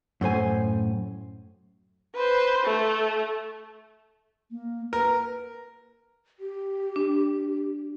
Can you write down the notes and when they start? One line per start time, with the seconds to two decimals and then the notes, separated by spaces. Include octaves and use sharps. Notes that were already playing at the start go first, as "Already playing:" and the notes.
0.21 F#2 A2 C5 G#5
2.15 B4 C5
2.65 A3
4.51 A#3
4.93 A#4 B4
6.39 G4
6.96 D4